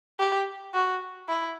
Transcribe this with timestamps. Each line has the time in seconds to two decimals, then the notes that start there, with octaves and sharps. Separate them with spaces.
0.19 G4
0.74 F#4
1.29 E4